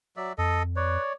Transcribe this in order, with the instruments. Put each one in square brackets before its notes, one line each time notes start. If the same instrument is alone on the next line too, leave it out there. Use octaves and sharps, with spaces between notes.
[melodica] F#3 D5 E5
[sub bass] F2 [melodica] A4 D#5
[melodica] B4 [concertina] C#5 D5